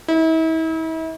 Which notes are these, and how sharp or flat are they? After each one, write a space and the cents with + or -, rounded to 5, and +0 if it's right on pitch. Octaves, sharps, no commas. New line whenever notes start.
E4 -40